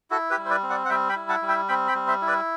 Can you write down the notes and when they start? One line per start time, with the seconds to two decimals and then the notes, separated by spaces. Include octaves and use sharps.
0.10 E4 F#4 A4
0.30 G4 B4
0.37 G3
0.45 C5
0.50 B4 D5
0.63 C4
0.70 D5 F#5
0.85 F#5
0.89 G3 E5 G5
1.09 G5 B5
1.16 E4
1.29 F#5 A5
1.42 G3
1.48 E5 G5
1.69 C4 G5 B5
1.88 G5 B5
1.95 G3
2.08 C5 E5
2.22 E4
2.27 B4 D5